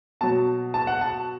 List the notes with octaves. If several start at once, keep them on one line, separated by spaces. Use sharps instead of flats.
B2 F#3 A5
A5
F#5
A5